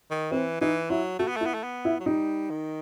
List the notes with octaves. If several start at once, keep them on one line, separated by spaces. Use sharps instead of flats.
D#3
E3 C4
E3 D#4
F#3 E4
A3 F#4
B3
A3
E4
B3
A3
B3
E4
F#3
G3 D#4
D#3